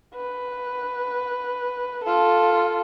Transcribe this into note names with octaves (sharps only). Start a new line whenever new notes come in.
B4
F4 A4